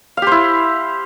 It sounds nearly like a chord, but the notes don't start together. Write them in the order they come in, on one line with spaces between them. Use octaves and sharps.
F5 G4 C5 E4